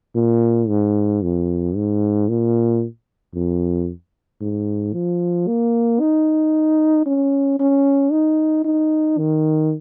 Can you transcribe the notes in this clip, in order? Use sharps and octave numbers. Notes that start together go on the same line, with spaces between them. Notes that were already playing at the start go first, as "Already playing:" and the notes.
A#2
G#2
F2
G#2
A#2
F2
G#2
F3
A#3
D#4
C#4
C#4
D#4
D#4
D#3